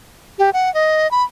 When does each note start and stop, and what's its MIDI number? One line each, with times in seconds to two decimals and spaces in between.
0.39 0.50 67
0.53 0.72 78
0.74 1.10 75
1.11 1.24 83